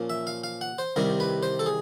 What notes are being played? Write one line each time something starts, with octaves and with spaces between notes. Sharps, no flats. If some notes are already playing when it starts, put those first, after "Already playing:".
Already playing: A#2 F3 A#3 C#4
E5
F5
F5
F#5
C5
C2 C3 D#3 G3 A#4
B4
C5
A4
G#4